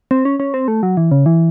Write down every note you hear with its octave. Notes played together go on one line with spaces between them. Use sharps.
C4
C#4
C#4
C4
A3
F#3
E3
C#3
E3